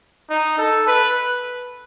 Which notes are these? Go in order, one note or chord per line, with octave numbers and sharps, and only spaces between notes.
D#4
A4
B4